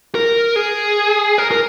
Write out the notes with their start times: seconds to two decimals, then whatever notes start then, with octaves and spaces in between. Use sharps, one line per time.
0.15 A#4
0.56 G#4
1.38 A#4
1.51 A#4